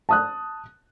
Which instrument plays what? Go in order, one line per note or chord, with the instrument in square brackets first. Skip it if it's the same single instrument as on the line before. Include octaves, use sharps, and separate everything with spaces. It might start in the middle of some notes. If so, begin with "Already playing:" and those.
[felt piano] A5 D#6 F#6